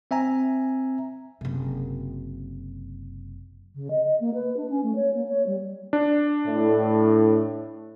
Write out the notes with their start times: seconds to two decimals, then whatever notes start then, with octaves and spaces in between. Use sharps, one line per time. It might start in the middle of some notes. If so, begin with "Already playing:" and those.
0.11 C4 E5 G#5 A#5
1.41 F#1 C3
3.75 C#3
3.90 D#5
4.04 D#5
4.20 A#3
4.34 B4
4.57 D4
4.70 C#4
4.83 A3
4.95 C#5
5.14 A#3
5.28 C#5
5.47 G3
5.93 D4
6.45 A2